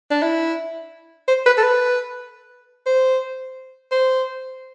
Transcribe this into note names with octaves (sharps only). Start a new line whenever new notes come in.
D4
E4
C5
B4
A4
B4
C5
C5